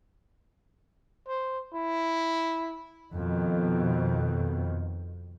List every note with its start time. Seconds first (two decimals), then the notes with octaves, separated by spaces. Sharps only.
1.27 C5
1.74 E4
3.13 F2 B2 D#3